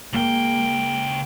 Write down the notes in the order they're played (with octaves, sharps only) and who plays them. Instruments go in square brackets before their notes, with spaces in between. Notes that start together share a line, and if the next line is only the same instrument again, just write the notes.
[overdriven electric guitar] C#2 G5 [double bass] G#3 A#3